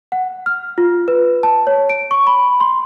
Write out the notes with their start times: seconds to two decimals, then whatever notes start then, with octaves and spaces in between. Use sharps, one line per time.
0.12 F#5
0.46 F6
0.78 F4
1.08 B4
1.43 A5
1.67 C#5
1.90 D7
2.11 C#6
2.27 B5
2.60 C6